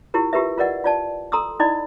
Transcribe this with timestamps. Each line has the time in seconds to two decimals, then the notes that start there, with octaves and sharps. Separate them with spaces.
0.14 E4 F4 G4 A#4
0.33 F4 G4 A#4 B4 E5
0.58 F4 A#4 B4 D5 D#5 F#5
0.84 F4 D5 A5
1.32 A4 A#5 C6 D#6 E6
1.60 D#4 E4 D5 D#5 B5